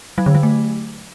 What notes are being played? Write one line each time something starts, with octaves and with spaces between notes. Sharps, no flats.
F#3
D3
F#3
A3